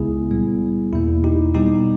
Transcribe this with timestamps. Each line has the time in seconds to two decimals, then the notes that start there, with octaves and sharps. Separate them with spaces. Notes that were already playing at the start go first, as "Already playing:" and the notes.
Already playing: C#2 C#3 G#3 B3 E4 G#4
0.31 A#2 G3 B3
0.93 E2 B2 A#3 E4
1.24 D#4 G4
1.55 B2 G3 B3 D#4 G4